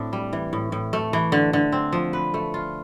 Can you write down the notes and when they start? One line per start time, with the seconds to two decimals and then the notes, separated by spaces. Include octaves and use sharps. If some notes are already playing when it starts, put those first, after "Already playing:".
Already playing: A2 C4 D4
0.13 G3
0.33 E3
0.53 A2
0.72 A2
0.93 A3
1.13 E3
1.32 D3
1.53 D3
1.72 C4
1.92 F3
2.13 B4
2.34 A3
2.54 F4